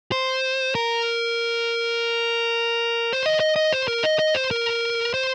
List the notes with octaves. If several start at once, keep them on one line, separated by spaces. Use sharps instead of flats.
C5
A#4
C5
D#5
D#5
D#5
C5
A#4
D#5
D#5
C5
A#4
C5